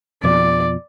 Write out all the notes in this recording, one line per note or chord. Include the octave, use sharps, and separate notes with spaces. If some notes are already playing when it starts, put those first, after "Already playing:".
F2 B2 F3 D5